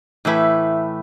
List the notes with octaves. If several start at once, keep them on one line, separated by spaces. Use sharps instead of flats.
A2 E3 A3 E4 B4